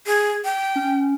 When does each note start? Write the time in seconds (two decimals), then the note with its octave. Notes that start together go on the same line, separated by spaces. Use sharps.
0.06 G#4
0.45 G5
0.76 C#4